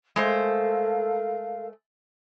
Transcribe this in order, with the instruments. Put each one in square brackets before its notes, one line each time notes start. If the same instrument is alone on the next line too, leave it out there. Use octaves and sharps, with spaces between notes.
[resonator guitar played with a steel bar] G#3 A3 C5 [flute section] A4 A#4 F5